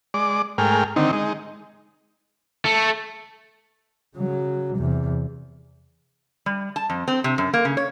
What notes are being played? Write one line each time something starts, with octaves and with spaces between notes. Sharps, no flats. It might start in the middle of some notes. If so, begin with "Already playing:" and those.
G#3 D5 D6
G#2 A3 G#4 A#4 G5 F6
D3 D#3 C4 D#4
G#3 D#4
A3
C#3 F#3
E2 C3
G3
A5
F2
C4
C3
F#2
A#3
C#3
C#5